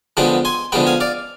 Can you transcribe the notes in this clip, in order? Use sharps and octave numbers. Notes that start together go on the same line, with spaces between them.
D3 F3 G#3 B3 G5 B5
G#5 C6
D3 F3 G#3 B3 G5 B5
F5 G#5
D5 F5